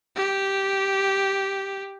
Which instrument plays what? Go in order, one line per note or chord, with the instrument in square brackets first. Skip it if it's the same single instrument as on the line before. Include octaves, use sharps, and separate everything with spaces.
[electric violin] G4